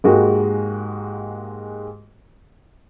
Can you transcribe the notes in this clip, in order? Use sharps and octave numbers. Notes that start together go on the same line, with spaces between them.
G#2 G#3 A#3 F#4 G4